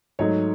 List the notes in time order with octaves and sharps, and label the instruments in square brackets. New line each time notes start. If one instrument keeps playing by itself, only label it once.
[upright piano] G#2 F#3 A3 D#4 C#5